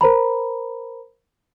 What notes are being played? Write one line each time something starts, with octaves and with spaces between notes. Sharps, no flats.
A#4 C5 A#5 B5